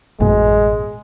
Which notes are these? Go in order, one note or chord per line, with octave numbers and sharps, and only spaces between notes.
A1 F#2 B2 G#3